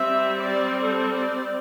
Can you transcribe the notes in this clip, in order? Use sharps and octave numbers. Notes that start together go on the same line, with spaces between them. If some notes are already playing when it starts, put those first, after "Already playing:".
Already playing: G3 C4 E5
D5
A4
D5